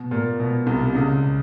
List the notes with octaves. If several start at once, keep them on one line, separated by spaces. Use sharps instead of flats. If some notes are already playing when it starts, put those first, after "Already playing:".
Already playing: B2
A#2
B2
C2 C3
C#2 C#3